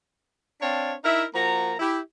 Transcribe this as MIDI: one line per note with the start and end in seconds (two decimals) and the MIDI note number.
0.61 0.93 60
0.61 0.93 62
0.61 0.93 73
0.61 0.93 77
0.61 0.93 81
1.04 1.24 63
1.04 1.24 64
1.04 1.24 70
1.04 1.24 76
1.34 1.75 53
1.34 1.75 58
1.34 1.75 66
1.34 1.75 82
1.79 1.98 64
1.79 1.98 67